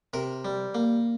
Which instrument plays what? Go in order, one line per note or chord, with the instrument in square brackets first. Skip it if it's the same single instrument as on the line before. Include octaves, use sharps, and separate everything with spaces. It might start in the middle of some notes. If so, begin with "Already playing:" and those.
[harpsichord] C3 A#4
G3
A#3